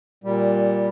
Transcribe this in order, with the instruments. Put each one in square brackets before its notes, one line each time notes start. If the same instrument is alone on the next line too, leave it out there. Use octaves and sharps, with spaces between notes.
[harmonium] A#2 G3